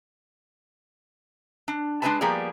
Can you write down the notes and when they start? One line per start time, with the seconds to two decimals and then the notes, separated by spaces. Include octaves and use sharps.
1.68 D4
2.02 G#3 D4 G4 B4 G#5 A5
2.21 F3 G3 A#3 B3 G#4 D5